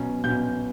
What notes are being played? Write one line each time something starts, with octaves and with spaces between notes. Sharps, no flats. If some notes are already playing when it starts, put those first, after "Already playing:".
Already playing: B2 F#3 C#4
B2 F#3 C#4 G6